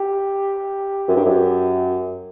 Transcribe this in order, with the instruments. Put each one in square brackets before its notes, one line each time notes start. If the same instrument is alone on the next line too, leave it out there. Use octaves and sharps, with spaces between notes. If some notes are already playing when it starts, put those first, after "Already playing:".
Already playing: [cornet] G4
[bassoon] F#2
G2
F#2